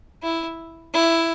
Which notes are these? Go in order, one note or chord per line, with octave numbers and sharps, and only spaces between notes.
E4
E4